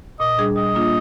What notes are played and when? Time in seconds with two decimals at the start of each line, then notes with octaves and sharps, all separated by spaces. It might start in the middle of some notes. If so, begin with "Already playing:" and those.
0.20 A#2 D#5
0.38 G3 D4 G#4
0.56 G3 D#5
0.75 A#3 D4 F4